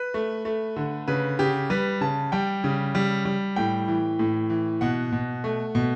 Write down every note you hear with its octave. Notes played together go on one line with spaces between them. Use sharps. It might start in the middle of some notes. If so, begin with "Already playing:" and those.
Already playing: B4
A3
A3
D3
C#3 B4
C#3 G4
G3 B4
C#3 A5
G3 G5
C#3
G3
G3
A2 G5
E3
A2
E3
B2 F#5
B2
A3
B2